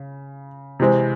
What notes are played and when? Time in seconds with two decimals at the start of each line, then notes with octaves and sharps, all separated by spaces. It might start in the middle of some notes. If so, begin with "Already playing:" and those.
Already playing: C#3
0.80 C3 E3 G#3 C4